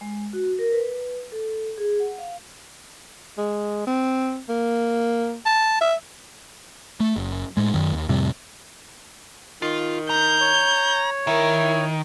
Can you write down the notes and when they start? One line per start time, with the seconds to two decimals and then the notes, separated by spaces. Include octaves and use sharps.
0.01 G#3
0.33 F#4
0.59 A#4
0.72 B4
1.32 A4
1.78 G#4
2.00 F#5
2.19 F5
3.38 G#3
3.87 C4
4.49 A#3
5.46 A5
5.81 E5
7.00 A3
7.16 F#1
7.57 A2 G#3
7.74 F#2 D#3
7.93 D#2
8.09 F2 A2 C3 G3
9.62 D#3 F4
10.10 A#5 G6
10.40 C#5
11.27 D#3 E4 A#4